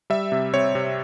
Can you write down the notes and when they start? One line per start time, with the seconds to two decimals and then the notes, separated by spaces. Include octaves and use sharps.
0.10 G3 E5
0.32 C3
0.54 C4 C#5
0.75 C3